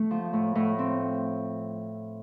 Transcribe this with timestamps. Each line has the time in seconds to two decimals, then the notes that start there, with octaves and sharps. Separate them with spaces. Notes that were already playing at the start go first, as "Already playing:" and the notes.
Already playing: A3
0.11 F3
0.33 A2
0.55 A2
0.79 C4